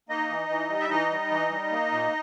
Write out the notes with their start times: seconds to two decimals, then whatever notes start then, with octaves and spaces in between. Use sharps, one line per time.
0.09 A#3 D#4 D#5
0.29 E3
0.49 E3
0.69 G3
0.80 E5
0.89 E3 D#4 D#5
1.10 G3
1.31 E3
1.50 G3
1.71 A#3
1.92 A#2